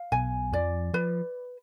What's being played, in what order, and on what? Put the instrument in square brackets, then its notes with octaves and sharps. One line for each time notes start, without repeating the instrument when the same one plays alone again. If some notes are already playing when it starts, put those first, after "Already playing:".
Already playing: [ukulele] F5
[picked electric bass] B1 B2 [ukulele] G#5
[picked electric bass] F2 F3 [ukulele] D5
[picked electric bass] F3 [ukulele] B4